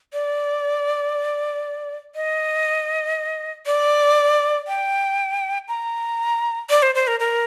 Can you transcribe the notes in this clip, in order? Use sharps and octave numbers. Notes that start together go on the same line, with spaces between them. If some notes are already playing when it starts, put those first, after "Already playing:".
D5
D#5
D5
G5
A#5
D5
C5
C5
A#4
A#4